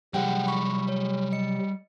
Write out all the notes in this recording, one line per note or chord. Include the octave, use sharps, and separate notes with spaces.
C3 F#3 G3 G4 G#4 F#5 G5
B5 C#6
C#5
D#5 C#7